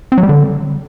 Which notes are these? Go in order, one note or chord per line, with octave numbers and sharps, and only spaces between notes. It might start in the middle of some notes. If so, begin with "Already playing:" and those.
C4
F#3
G3
D3